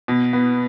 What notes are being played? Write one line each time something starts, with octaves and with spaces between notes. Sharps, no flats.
B2
B3